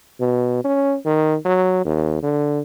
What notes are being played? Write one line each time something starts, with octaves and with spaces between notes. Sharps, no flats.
B2
C#4
D#3
F#3
D#2
D3